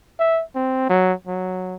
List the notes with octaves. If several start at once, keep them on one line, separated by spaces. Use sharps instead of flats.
E5
C4
F#3
F#3